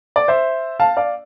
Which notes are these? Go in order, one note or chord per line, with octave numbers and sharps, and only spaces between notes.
D5
C5 E5
F5 A5
D5 F5